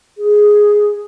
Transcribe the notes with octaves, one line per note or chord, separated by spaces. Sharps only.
G#4